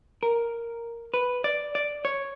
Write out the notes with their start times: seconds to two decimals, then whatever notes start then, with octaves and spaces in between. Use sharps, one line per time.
0.23 A#4
1.14 B4
1.44 D5
1.75 D5
2.05 C#5